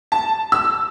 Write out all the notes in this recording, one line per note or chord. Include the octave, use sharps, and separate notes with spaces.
A5
E6